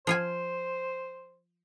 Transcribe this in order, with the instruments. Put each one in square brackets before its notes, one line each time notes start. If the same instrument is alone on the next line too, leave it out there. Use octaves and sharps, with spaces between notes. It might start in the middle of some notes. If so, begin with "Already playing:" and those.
[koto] F3 F4 G#5 [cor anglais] C5